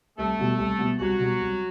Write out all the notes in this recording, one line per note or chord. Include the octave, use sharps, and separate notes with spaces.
C2 A3 A4
B2 G3 B3
C2
B2 G3 B3
C2 F#3 F#4
B2 G3 B3
C2